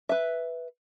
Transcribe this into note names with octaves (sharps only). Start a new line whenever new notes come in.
B4 E5